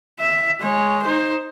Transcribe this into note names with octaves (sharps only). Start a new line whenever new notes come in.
E5
G#3 C#5
D#4 C5